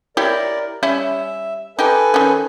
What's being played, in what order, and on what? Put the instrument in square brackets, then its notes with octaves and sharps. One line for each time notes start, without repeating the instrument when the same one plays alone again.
[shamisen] E4 G4 C#5 [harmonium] A#4 D5
[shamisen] G3 C#4 E4 [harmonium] E5
[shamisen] D#4 G4 [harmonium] A4 B4 G#5
[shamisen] D#3 C#4